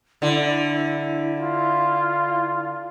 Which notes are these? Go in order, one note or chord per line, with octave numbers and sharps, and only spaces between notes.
D3 E4
F4